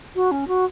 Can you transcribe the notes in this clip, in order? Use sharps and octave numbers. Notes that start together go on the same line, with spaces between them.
F#4
C#4
F#4